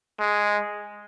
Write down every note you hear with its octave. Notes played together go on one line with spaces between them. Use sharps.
G#3